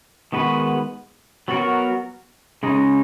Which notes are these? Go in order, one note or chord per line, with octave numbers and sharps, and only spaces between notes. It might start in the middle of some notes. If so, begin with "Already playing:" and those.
D#3 G#3 B3 F#4 B4
F#3 B3 F#4 A#4
C#3 G#3 D#4